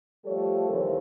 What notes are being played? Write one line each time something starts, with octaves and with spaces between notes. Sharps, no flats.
F3 G3 A3 G4 A4 C#5
D#2 C3 E3 F3 A#4 C#5